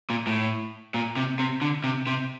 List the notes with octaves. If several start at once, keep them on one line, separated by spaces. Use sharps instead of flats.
A#2
A2
A#2
C3
C3
D3
C3
C3